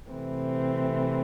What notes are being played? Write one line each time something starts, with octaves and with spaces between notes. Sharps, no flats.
C3 E3 A3 C4